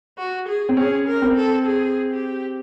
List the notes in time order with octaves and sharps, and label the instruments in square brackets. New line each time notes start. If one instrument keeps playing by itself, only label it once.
[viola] F#4
G#4
[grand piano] C4
[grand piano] C#4 [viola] G#4
[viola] A#4
[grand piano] C4
[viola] A4
G#4
G4